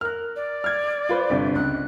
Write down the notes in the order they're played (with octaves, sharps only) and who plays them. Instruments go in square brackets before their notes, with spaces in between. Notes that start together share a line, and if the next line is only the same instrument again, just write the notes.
[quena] A#4 [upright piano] F6 F#6
[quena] D5
[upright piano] F6 G#6
F4 B4 C5
G1 C3
[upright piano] C#2 [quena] F#6